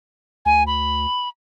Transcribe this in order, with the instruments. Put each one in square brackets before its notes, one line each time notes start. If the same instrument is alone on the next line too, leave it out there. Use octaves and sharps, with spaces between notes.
[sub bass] D2 [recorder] G#5
[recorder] B5